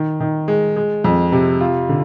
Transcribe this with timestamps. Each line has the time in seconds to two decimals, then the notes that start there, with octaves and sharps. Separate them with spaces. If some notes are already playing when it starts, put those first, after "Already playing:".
Already playing: D#3
0.20 D#3
0.48 G#3
0.76 G#3
1.04 F2
1.32 C3
1.61 F4
1.89 D3